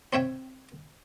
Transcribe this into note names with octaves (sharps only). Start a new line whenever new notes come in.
C4 C#5 E5 G5